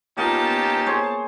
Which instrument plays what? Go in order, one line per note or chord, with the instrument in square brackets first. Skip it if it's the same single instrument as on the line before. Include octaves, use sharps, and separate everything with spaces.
[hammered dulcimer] A#3 [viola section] B3 F4 A5 [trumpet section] C#4 D#4 G4
[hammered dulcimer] G#4 C5 C#5